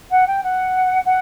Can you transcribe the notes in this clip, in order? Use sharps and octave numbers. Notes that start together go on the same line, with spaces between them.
F#5
G5
F#5
F#5